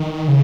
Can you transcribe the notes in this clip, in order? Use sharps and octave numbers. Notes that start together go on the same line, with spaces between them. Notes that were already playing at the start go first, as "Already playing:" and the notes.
Already playing: D#3
C#3